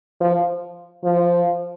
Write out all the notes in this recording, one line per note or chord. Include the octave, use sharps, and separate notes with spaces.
F3
F3